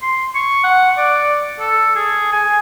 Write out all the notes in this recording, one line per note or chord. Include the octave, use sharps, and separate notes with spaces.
C6
C#6
F#5
D5
A4
G#4
G#5